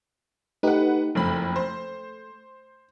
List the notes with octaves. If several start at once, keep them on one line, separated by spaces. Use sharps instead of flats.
A3 D#4 G4 B4 F#5
F#1 F2 A3 B5
C5